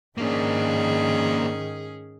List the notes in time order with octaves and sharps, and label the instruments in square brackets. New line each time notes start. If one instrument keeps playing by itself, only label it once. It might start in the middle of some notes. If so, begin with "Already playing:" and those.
[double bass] G#2 D#3 [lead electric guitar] A#3 D4 [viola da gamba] C#4 G#4